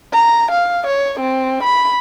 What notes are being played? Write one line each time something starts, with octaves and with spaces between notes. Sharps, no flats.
A#5
F5
C#5
C4
B5